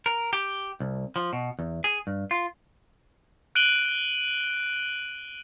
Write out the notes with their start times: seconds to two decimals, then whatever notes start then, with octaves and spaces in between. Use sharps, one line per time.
0.06 A#4
0.33 G4
0.80 C2
1.16 F3
1.33 B2
1.59 E2
1.84 G#4
2.07 G2
2.31 F4
3.55 F#6 D7 D#7 F#7 G7